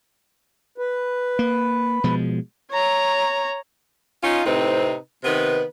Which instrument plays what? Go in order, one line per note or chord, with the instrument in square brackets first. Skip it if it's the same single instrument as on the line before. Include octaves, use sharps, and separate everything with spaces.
[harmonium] B4
[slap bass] A#3
B2 F3 G#3
[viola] C#5 A#5
[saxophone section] C#4 D#4 F4
A2 C3 C4 D#4 B4
C3 D#3 B3 B4